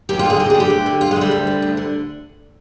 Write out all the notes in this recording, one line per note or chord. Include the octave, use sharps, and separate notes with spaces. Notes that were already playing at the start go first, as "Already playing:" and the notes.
D#2 G4
F4
D3
G#4
D#2 G4
G#4
D3
G4
D2
D3
D2 F4
G#3
D3
G3
D2
D3
D2
D3